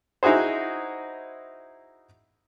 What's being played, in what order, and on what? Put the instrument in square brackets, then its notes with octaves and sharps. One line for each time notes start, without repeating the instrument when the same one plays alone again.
[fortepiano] D#4 E4 F#4 G#4 C5